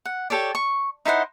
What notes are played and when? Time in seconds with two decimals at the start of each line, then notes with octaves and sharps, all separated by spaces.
0.05 F#5
0.30 G4 A4 C#5 D5
0.55 C#6
1.05 D#4 E4 C5 F#5